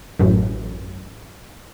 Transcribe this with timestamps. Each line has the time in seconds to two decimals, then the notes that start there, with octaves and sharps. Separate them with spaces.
0.19 A1 F#2